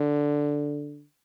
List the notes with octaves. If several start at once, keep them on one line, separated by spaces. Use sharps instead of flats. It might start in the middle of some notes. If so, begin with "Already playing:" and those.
Already playing: D3